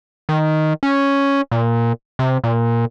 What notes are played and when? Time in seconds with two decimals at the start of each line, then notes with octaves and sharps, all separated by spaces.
0.29 D#3
0.83 C#4
1.52 A#2
2.19 C3
2.44 A#2